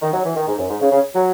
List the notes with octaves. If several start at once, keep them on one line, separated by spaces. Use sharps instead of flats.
D#3
F#3
E3
D#3
G#2
F#2
G#2
C#3
C#3
F#3